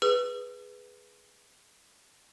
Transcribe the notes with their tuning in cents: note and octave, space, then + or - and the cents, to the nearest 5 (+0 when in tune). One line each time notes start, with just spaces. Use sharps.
G#4 +0 B4 +0 E6 +45